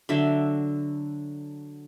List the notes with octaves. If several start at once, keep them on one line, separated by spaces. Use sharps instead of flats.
D3 F#3 E5